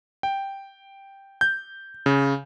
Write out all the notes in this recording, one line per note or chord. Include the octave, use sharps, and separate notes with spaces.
G5
G6
C#3